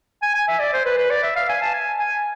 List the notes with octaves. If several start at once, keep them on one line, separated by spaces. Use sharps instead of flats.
G#5
G#5
E5
D5
C5
B4
B4
D5
E5
F5
G#5
A5
G#5
G#5